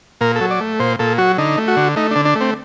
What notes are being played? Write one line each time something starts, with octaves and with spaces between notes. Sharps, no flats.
A#2 A#4
A4
F#3
D5
A3
A#2 C5
A#2 A4
F#3 F#4
D3 D#4
A3
F#4
D3
A3 D#4
D3 D4
D4
A3 C4